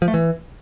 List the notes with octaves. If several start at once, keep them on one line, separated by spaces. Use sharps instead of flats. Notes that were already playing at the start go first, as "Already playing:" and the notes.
F3
A3
E3